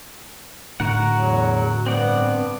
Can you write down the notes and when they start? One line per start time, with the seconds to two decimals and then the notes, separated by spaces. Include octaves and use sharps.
0.80 A2 D3 F#4 A#4 F#5
1.16 E2 F#3
1.86 G2 B3 C4 D5 F#5